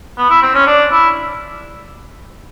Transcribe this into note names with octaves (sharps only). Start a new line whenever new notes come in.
B3
E4
C4
C#4
D4
E4